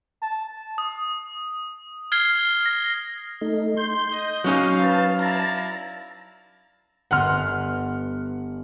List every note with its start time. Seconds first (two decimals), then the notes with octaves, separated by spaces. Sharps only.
0.22 A5
0.78 D#6
2.12 F6 G#6 C7 G7
2.66 A#6
3.41 A3 D#4
3.77 C6 G6
4.11 D#5
4.44 F#3 C#4 D#4 F5
4.79 B4 A5
5.19 E4 D5 F5 A5 A#5
7.11 G1 B3 F#5 C6 F6